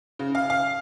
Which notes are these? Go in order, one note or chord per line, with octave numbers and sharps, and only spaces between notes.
C#3
F5
F5